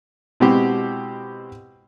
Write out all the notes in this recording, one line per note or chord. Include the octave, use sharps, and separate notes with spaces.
B2 G#3 C4 E4 F#4 G4